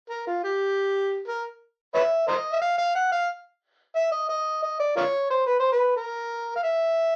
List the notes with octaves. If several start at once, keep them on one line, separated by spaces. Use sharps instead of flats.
A#4
F4
G4
A#4
B4 C#5 E5
A#4 C5 D#5
E5
F5
F5
F#5
F5
E5
D#5
D#5
D#5
D5
F4 A#4 C#5
C5
B4
C5
B4
A#4
F5
E5